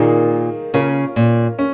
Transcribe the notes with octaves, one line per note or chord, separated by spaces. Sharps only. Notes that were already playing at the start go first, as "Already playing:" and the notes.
Already playing: A#2 D#3 A#3 D#4 G#4
C#3 A#3 C#4 F4 A#4
A#2
C#4